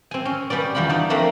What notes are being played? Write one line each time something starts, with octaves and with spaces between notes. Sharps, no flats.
C4 G#5
C#4
G3 B3 C#4 D5
E2 G3 F4 D5 B5
D4 D#4 D5 F#5
F3 A3 A#3 C4 D4